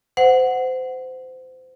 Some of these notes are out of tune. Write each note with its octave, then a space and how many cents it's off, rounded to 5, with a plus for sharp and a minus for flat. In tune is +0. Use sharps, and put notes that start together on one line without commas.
C5 -25 F#5 +0